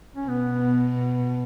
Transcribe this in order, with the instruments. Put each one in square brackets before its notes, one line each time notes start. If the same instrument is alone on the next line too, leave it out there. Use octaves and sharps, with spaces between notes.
[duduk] C#4
[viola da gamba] B2 [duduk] B3